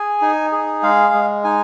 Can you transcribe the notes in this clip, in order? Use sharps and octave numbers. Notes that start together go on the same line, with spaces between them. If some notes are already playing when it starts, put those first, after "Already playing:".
Already playing: G#4 G#5
D#4
G#4
G#3 F5
G#3
D#4 G#5